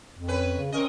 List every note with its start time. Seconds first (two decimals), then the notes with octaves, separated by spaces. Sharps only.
0.15 F2
0.28 C#4 B4
0.57 C#3
0.72 C4 C#4 A#4 D#5